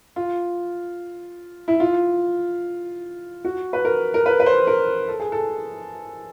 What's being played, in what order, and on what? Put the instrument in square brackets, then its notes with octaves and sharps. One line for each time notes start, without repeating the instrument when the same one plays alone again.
[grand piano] F4
E4
F4
F#4
B4
A#4
A#4
B4
B4
C5
A#4
A4
G#4
A4